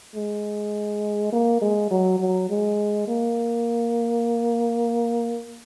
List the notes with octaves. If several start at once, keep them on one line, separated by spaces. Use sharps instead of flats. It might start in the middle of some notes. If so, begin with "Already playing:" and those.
G#3
A#3
G#3
F#3
F#3
G#3
A#3